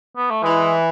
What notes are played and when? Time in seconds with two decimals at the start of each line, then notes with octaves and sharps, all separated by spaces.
0.16 B3
0.30 A3
0.43 E3 G#3